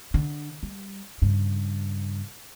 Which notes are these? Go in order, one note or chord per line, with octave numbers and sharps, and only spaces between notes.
D3
G3
G2 C#3